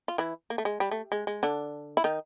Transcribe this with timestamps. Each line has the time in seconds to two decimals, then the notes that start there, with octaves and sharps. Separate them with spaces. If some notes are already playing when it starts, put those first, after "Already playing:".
0.08 F4
0.18 E3 E4
0.50 A#3
0.58 A3
0.65 G#3
0.80 G3
0.91 A3
1.12 G#3
1.27 G#3
1.43 D3 D4
1.97 E4
2.04 D#3 D#4